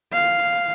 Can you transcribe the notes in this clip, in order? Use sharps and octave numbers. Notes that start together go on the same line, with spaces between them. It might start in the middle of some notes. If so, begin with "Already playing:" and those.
F5